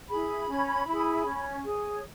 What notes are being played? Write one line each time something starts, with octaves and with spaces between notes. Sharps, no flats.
E4 G#4 B5
C#4
E4 G#4
C#4
G#4 C#5